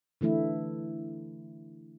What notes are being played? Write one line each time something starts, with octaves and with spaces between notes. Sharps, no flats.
D3 E3 A3 E4